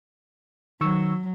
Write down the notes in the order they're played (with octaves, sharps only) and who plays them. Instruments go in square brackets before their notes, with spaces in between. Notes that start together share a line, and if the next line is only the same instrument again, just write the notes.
[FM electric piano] D#3 C#6 E6 [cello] F#3